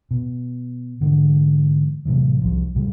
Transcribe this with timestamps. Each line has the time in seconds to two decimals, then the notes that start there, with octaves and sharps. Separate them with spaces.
0.11 B2
1.01 G#2 D3 E3 G#3
2.05 A2 C3 E3 F#3
2.42 C2 F3
2.75 B1 A2 C#3 G3